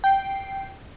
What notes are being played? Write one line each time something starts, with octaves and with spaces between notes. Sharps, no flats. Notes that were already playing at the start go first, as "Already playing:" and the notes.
G5 C7